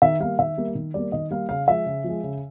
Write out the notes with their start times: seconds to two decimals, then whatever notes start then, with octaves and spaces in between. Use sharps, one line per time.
0.02 D#3 E5
0.20 G3 A#3 F5
0.39 D#3 E5
0.57 G3 A#3
0.75 D#3
0.94 G3 A#3 D5
1.12 D#3 D#5
1.31 G3 A#3 F5
1.49 C#3 F5
1.68 F3 G#3 E5
1.86 C#3
2.04 F3 G#3
2.24 C#3